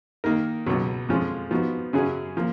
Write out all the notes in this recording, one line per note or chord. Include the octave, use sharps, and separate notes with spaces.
D#3 A#3 D#4 A#4
C#2 B2 F#3
F2 F3 G#3 C#4
F3 B3 D#4 F#4
F#2 C#3 F#3 C#4 G#4
F3 A#3